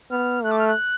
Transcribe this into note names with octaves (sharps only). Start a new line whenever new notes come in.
B3 F6
A3 F#6
D6
F6
F#6